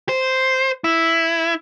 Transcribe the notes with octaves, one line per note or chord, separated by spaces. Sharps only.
C5
E4